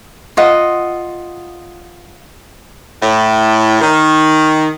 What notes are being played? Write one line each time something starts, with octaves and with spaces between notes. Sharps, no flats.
F4 D#5 F#5
A2
D#3